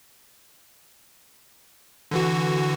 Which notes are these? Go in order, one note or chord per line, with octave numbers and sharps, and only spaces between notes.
D3 E3 F#4